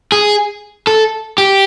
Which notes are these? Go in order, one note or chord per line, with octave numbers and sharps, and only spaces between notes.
G#4
A4
G4